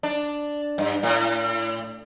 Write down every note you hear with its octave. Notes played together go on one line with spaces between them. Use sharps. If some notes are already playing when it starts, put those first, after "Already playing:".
D4
G2
A2